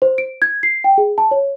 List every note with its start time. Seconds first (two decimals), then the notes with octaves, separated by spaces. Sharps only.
0.02 C5
0.18 D7
0.42 G#6
0.63 C7
0.84 G5
0.98 G#4
1.18 A5
1.31 C#5